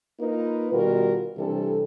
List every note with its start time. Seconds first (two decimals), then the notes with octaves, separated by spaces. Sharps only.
0.20 A#3 D#4 F4 A#4 B4
0.72 B2 D#3 G3 F4 F#4 A#4
1.37 C3 E3 G3 D4 A4